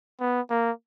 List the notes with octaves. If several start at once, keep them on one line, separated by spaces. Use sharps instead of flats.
B3
A#3